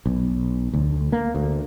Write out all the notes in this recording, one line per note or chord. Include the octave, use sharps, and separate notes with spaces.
B1
D2
A#3
D2